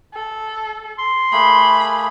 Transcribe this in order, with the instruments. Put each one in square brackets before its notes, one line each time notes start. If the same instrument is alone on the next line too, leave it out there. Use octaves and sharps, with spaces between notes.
[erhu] A4
[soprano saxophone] C6
[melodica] A3 A#3 G#4 [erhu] B5